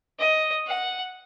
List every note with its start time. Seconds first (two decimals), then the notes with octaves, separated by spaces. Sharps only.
0.19 D#5
0.67 F#5